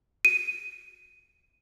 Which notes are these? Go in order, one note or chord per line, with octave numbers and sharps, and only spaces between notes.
D#7